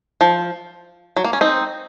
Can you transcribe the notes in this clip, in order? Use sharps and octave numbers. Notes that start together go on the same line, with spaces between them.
F3
F#3
A#3
C#4
C4 D#4